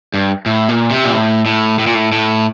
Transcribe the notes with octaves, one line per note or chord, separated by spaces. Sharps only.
G2
A2
A#2
C3
A#2
A2
A2
A2
A#2
A2
A2